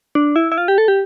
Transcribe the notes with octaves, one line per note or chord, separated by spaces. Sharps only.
D4
E4
E4
F4
G4
A4
G4